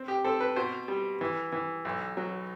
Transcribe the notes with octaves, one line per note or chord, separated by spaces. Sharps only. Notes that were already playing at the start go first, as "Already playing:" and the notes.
Already playing: C4
G4
C4 A4
B4
B2 C5
G3
E3
E3
B1
F#3